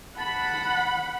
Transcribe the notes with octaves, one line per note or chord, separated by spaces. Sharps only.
F#5 A5 B5